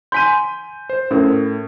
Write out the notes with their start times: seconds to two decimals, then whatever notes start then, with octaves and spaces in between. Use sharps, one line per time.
0.12 G#5 C6 G6 B6 D#7
0.89 C5
1.11 A2 C#4 A#4